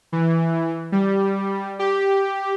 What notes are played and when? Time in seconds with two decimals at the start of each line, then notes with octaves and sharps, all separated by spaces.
0.12 E3
0.92 G3
1.79 G4